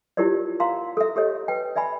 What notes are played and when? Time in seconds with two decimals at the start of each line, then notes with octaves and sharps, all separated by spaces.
0.17 E4 F4 G4 A#4 C#5 D5
0.60 A#4 F5 F#5 A#5 C6
0.97 A4 E5
1.16 G4 A4 C#5 D#5
1.48 B4 G5
1.76 D5 E5 G#5 B5